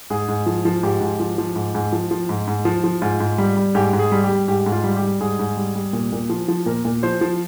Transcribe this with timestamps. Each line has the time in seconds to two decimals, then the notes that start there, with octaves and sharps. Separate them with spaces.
0.10 G#2 G#4
0.28 G#2
0.46 F3
0.65 F3
0.83 G#2 G4
1.01 G#2
1.20 F3
1.38 F3
1.56 G#2
1.75 G#2
1.93 F3
2.11 F3
2.29 G#2
2.48 G#2
2.65 F3
2.84 F3
3.02 G#2 F4
3.20 G#2
3.38 G3
3.57 G3
3.75 G#2 G4
3.93 G#2
3.99 G#4
4.12 G3
4.23 G4
4.30 G3
4.48 G#2 G4
4.66 G#2
4.72 F4
4.84 G3
4.97 G4
5.03 G3
5.20 G#2 G#4
5.39 G#2
5.57 G3
5.75 G3
5.93 A#2
6.12 A#2
6.30 F3
6.48 F3
6.66 A#2 A#4
6.85 A#2
7.03 F3 C5
7.21 F3